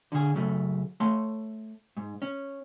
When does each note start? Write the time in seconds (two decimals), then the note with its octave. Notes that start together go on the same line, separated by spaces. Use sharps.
0.12 D3 G#4
0.35 F#2 C#3 A3
1.00 A3 C#5 C6
1.97 G#2
2.22 C#4